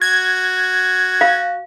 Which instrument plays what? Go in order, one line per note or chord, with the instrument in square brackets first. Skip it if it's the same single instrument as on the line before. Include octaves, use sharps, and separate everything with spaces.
[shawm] F#4 [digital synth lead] G#6
[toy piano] F5